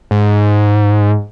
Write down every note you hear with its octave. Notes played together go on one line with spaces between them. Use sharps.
G#2